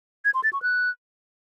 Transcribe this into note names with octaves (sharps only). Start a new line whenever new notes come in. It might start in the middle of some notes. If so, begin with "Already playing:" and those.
G#6
C6
A6
C#6
F#6